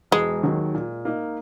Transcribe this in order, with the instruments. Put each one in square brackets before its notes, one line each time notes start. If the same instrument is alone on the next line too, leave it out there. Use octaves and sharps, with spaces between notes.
[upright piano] E1 [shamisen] G#3
[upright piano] D#2 D#3 F#3
A#2
A#3 D#4